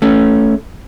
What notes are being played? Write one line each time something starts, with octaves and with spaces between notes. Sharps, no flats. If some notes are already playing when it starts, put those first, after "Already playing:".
A3 C#4